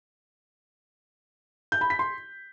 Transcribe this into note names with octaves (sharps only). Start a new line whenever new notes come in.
G6
B5
B6
C6